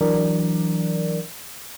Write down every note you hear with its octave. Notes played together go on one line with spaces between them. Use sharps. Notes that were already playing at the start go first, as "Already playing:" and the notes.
E3 F#3 D4 A#4 D5